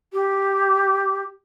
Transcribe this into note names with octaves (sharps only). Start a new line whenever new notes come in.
G4